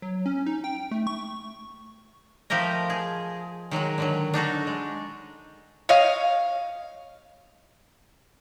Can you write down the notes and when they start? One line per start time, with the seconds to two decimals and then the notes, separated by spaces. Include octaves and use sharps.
0.02 F#3
0.26 C#4
0.46 D#4
0.64 G5
0.91 A3
1.07 C#6
2.50 F3 A3 G4 A#4 D#5
2.90 G#4
3.71 D#3 F#3 G#3 F#4
3.98 D3 D#3 F#3
4.34 D4 D#4 F#4 A4
4.67 G#3
5.89 C#5 D#5 F5